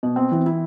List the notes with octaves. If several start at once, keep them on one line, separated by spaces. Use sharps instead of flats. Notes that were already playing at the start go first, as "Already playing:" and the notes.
B2
C4
E3
E4